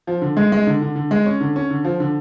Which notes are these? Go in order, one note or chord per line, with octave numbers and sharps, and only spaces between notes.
F3
D3
G#3
G#3
D3
D3
D3
G#3
C#4
D3
C#4
D3
F3
D3